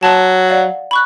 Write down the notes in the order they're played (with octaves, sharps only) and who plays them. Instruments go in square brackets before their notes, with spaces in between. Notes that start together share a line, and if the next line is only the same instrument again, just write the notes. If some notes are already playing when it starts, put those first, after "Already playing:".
[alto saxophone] F#3 [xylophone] A5
[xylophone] D5 F5 F#5
B5 C#6 F#6